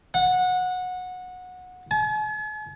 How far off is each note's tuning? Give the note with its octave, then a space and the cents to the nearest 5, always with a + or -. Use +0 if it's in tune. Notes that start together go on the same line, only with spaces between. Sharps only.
F#5 -20
G#5 +45